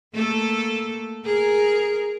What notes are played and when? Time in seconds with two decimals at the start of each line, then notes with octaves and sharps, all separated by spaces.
0.14 A3 A#3 A4
1.24 G#4 A#4